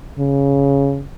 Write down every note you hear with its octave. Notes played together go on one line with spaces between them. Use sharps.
C#3